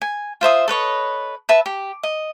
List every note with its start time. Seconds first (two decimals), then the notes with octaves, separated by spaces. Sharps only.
0.02 G#5
0.41 F4 C5 E5 D#6
0.68 A4 B4 C#5 D#5
1.49 B4 E5 A5
1.66 G4
2.03 D#5